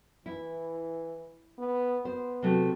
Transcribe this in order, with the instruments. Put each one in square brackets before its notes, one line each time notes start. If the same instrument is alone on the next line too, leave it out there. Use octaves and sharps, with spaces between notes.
[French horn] E3 [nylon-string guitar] E4
[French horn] B3
[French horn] B3 [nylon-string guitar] C5
[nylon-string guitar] C3 F#3 A3